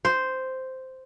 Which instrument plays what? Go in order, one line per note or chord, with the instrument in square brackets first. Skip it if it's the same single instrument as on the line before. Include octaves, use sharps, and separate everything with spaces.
[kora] C5